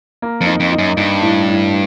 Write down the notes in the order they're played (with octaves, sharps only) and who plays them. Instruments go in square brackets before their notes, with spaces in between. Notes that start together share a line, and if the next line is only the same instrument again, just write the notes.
[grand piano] A#3
[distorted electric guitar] F2
[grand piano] D#4
[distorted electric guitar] F2
[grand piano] D#4
[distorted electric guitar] F#2
[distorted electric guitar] G2 [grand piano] D#4
[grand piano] A2
A2